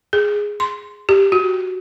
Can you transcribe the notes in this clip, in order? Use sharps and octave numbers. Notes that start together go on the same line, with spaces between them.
G#4
C6
G4
F#4